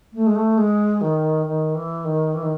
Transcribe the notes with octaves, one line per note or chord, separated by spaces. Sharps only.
A3
G#3
A3
G#3
D#3
D#3
E3
D#3
E3
D#3